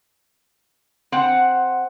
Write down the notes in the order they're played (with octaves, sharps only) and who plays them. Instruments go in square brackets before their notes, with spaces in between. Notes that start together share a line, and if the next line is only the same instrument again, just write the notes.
[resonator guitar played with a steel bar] C4 F#5